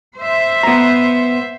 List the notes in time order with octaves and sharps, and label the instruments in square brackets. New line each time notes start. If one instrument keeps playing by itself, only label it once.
[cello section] C5 E5
[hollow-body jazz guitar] B3 A#5